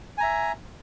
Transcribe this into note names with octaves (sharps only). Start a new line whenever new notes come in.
E5 G#5 A#5